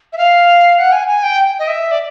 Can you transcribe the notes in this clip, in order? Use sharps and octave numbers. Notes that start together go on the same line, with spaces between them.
E5
F5
F#5
G#5
G#5
G5
D#5
E5
D5